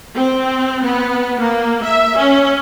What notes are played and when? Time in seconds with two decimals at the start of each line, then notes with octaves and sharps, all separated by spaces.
0.15 C4
0.83 B3
1.40 A#3
1.84 E5
2.18 C#4